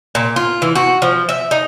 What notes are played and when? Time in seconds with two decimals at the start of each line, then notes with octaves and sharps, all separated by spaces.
0.15 A#2
0.36 F4
0.62 E3
0.75 F#4
1.02 F3
1.29 E5
1.51 D#4